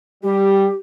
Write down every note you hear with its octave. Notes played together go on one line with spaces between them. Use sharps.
G3 G4